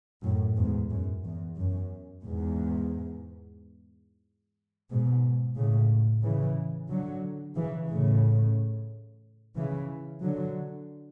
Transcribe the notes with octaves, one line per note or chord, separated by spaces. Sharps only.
F#2 A2
E2 G#2
F#2
E2
F#2
E2 G#2
G#2 B2
A2 C#3
C#3 E3
D3 F#3
C#3 E3
A2 C#3
C#3 E3
D3 F#3